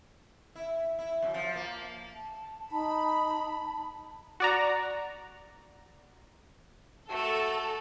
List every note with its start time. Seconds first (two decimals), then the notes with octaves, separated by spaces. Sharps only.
0.56 E4
0.99 E4
1.22 F#2
1.34 F3
1.56 A#3
2.14 A5
2.71 D#4 B5
4.40 F#4 D5 A#5
7.09 A3 F#4 A4